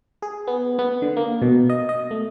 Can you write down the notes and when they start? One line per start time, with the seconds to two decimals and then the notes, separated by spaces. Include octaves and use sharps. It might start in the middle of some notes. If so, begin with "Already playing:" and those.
0.22 G#4
0.47 B3
0.79 B3
1.02 D3
1.17 A#3
1.42 B2
1.70 D#5
1.89 D#5
2.11 A3